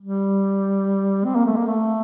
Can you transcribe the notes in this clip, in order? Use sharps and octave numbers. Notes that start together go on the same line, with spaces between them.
G3
C4
A#3
A3
A#3
A3